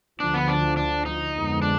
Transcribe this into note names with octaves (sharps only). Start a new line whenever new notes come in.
D2 D3 F3 D4
B3
D4
D4
D#4
F2 D3 G#3 B3
D4